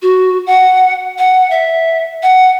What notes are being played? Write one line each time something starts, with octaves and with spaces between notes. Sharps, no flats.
F#4
F#5
F#5
E5
F#5